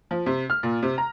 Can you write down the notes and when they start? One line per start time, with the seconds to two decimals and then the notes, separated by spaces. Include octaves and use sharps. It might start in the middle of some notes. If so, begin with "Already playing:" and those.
0.11 F3
0.26 C3
0.50 F6
0.63 A#2
0.83 C3
0.98 A#5